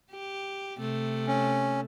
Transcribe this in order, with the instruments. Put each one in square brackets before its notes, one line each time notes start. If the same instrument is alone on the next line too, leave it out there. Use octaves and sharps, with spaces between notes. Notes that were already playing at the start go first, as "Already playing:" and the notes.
[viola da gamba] G4
C3 A3
[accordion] C#4